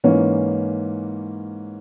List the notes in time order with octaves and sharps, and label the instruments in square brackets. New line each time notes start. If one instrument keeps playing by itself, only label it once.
[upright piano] G#2 E3 A#3 C#4